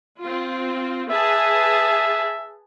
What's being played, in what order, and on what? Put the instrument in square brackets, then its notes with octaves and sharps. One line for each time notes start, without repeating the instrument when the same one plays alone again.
[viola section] C4 F4
[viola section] G#4 B4 A5 [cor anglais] E5